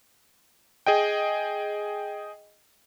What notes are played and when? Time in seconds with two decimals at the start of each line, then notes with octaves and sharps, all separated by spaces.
0.86 G#4 D#5 G5